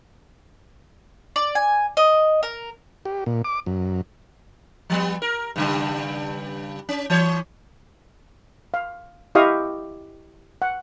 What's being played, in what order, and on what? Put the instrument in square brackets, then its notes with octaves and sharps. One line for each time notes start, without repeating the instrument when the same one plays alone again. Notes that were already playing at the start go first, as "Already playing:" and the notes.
[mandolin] D5
G#5
D#5
A#4
[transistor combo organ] G4
A#2
D6
F#2
[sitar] F3 G3 B3
A#4
G2 C#3 G3
C#4
E3 C#5
[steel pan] F5
E4 G4 D#5 F5 C#6 D#6
F#5